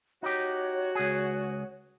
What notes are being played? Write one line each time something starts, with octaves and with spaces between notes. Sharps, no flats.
D#4 F#4 G4 C#5
C#2 G#4